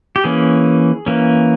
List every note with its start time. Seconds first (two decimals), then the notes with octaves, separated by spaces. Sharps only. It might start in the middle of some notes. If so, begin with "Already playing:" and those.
0.16 G4
0.24 E3 A#3 C#4 G#4
1.06 E3 A#3 C#4